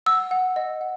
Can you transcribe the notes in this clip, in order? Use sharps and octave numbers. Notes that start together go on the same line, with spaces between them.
F#5 E6
F#5
D#5
F#5